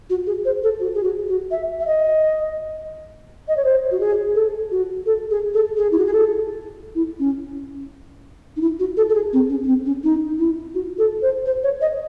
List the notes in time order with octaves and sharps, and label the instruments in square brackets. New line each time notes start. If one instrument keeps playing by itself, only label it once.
[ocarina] F#4
G#4
C5
A4
F#4
G#4
F#4
F#4
E5
E5
D#5
D#5
C#5
C5
F#4
G#4
A4
F#4
A4
G#4
A4
G#4
E4
F#4
G#4
A4
E4
C#4
D#4
E4
F#4
A4
A4
G#4
C4
C#4
C#4
C4
C#4
D#4
E4
F#4
A4
C5
C5
C#5
D#5